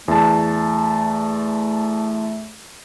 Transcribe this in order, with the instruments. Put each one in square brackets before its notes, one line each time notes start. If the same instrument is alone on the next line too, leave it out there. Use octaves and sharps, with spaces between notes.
[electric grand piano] E2 A5 [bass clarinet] A3